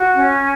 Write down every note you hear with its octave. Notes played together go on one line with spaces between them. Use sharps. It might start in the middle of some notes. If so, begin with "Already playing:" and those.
Already playing: F#4
C#4